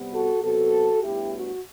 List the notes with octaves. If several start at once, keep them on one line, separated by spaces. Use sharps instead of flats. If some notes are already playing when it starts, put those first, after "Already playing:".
Already playing: C3 G3 B3
F#4 A4
C3 F#3 B3 F#4 A4
A2 G3 B3 D4 E4 G4
F#4